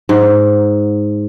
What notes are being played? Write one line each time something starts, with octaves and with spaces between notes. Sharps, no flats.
G#2